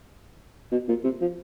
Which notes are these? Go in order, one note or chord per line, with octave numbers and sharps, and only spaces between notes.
B2
A#2
C3
F3